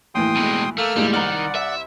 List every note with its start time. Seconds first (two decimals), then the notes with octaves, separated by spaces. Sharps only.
0.15 D#2 A2 E3 G5 C6 D#6
0.37 B2 G#3
0.78 A3 A#3 E6 F6
0.96 D#2 A2 G3 G#3
1.13 C2 D#3 D5 F#5 A#5 F6
1.55 E5